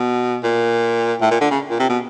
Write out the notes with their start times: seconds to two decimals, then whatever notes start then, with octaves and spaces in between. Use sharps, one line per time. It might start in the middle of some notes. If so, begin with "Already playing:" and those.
Already playing: B2
0.43 A#2
1.21 A2
1.31 A#2
1.41 D3
1.51 C#3
1.70 A#2
1.80 C3
1.89 B2